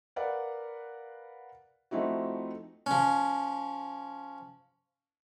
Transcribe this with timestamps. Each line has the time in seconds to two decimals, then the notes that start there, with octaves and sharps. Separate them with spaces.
0.16 A#4 B4 D5 F5 F#5
1.91 F3 A3 C4 D#4 E4 F#4
2.86 F3 C#4